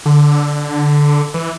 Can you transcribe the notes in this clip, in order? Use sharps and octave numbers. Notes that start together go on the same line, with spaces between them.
D3
E3